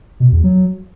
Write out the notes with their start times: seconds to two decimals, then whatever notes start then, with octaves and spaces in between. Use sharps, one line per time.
0.20 B2
0.32 E2
0.44 F#3